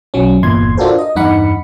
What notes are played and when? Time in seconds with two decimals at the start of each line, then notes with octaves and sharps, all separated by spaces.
0.14 B1 F#3 C#4
0.42 G1 E2 A#2 C6 G#6
0.77 D4 F4 F#4 A4 A#4 C5
0.99 D#5
1.16 E2 G2 D#4 F#5 B5 C#7